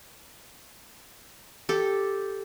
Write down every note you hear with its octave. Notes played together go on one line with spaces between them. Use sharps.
G4 A4